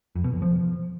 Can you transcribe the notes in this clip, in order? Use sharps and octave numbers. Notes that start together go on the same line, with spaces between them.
F2
B2
F2
F3